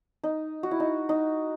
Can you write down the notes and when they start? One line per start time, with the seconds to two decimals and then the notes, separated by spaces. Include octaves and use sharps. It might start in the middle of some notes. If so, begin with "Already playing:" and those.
0.24 D#4
0.63 F#4
0.71 E4
0.80 D#4
1.09 D#4